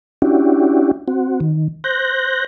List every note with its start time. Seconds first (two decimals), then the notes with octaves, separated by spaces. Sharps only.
0.22 C#4 D4 E4 F#4 G4
1.08 C4 F#4
1.40 D#3
1.84 C5 F#6 G6 A#6